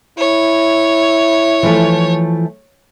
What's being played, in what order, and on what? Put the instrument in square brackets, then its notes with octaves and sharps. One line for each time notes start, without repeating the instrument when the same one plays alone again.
[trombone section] E4 [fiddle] C#5
[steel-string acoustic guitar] E3 F3 A3